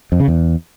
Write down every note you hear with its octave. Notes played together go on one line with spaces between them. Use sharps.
F2
C#3
E2